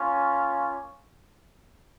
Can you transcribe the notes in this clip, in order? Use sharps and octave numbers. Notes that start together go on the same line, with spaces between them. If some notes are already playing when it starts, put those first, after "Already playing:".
Already playing: A#3 C#4 F4